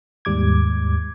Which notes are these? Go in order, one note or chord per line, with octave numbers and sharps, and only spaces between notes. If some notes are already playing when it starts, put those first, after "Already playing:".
D#2 G#2 G3 D6 G#6